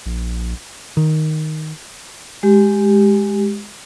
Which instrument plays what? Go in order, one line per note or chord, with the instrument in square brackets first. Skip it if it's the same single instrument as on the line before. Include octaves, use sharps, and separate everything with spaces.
[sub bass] A#1
[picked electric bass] D#3
[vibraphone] G#3 G4